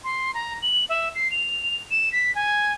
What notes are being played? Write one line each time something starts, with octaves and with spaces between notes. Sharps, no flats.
C6
A#5
F#7
E5
C7
F7
E7
B6
G#5